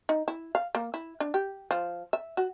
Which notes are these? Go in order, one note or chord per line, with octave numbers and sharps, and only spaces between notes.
D#4
E4
F5
A#3
E4
D4
G4
F3
E5
F#4